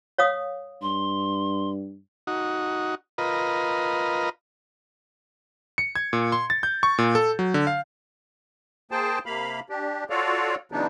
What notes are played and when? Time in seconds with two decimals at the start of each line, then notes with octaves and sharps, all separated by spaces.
0.18 C#5 F5 D#6
0.82 G2 C6
2.27 D#4 F#4
3.18 F4 A#4 B4 D#5
5.78 C#7
5.95 G#6
6.13 A#2
6.32 C6
6.50 A6
6.63 G6
6.83 C#6
6.98 A#2
7.15 A4
7.39 F#3
7.54 D3
7.67 F5
8.91 A#3 G#4 C5 G5 A5
9.26 C3 A#3 F5 B5
9.70 D4 G4
10.10 F4 F#4 A4 C#5 D5 F5
10.72 C#3 E3 F#3 B3 D4 D#4